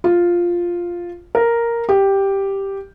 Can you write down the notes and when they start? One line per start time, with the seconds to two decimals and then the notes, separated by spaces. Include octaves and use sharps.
0.04 F4
1.35 A#4
1.89 G4